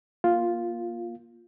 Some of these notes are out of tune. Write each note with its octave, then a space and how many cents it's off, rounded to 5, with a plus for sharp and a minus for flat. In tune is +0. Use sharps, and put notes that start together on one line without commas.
A#3 +20 F4 +0